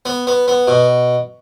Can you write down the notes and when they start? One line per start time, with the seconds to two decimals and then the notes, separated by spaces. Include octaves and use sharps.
0.06 B3
0.27 B3
0.48 B3
0.68 B2